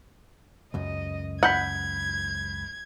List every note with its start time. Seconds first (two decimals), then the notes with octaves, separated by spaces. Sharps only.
0.74 C#2 F#2 D#5
1.43 F#5 B5 G6 G#6 B6